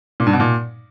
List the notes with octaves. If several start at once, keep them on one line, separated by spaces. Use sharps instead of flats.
A#2
G2
B2
A#2